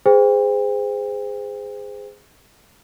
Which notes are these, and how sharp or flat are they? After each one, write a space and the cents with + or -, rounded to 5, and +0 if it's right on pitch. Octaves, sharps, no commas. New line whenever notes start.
G#4 -10 C5 -30 G5 +35